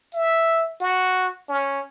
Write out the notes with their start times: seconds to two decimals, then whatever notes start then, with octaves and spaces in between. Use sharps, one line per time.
0.14 E5
0.81 F#4
1.49 C#4